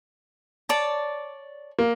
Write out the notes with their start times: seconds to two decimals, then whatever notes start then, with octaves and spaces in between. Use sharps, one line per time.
0.69 C#5 D5 A5
1.79 A#3